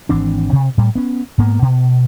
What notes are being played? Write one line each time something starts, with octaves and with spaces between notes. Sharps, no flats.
G#1 E3 C4 D4
C3
A2 G3
B3 C#4
G#2 A#3 B3
B2